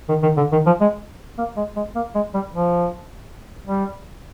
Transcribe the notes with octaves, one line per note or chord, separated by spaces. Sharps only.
D#3
D#3
D3
D#3
F3
G#3
A#3
G#3
G#3
A#3
G#3
G3
F3
G3